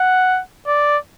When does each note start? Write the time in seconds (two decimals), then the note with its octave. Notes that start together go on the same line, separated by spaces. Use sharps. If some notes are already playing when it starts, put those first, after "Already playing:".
Already playing: F#5
0.67 D5